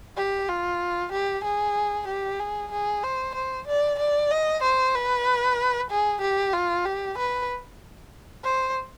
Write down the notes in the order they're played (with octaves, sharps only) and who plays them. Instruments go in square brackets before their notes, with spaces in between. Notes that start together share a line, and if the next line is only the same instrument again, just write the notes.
[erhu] G4
F4
G4
G#4
G4
G#4
G#4
C5
C5
D5
D5
D#5
C5
B4
G#4
G4
F4
G4
B4
C5